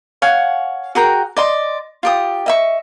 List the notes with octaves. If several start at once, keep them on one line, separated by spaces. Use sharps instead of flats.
C#5 F5 F#5 G#5
F#4 G#4 A#4 G5
D5 D#5 C6
F4 G4 D#6
D#5 E5 C#6